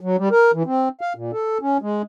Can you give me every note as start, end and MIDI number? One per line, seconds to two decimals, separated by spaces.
0.01 0.16 54
0.18 0.29 55
0.31 0.51 70
0.54 0.63 52
0.66 0.89 60
1.01 1.13 77
1.16 1.31 46
1.32 1.58 69
1.61 1.78 61
1.82 2.02 56